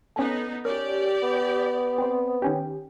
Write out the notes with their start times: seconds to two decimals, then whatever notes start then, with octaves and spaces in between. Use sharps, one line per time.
0.16 B3 C#4 D#4 A4
0.65 C#4 G4 A#4 D5
1.23 B3
1.98 C4 C5
2.42 D#3 C#4 G4